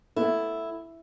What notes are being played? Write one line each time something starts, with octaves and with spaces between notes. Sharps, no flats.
A3 B3 E4